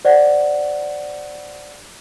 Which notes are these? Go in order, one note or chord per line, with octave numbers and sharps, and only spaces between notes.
C5 D5 F#5